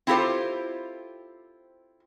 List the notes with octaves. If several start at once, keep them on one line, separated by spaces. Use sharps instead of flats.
C4 E4 F4 G4 A4 C5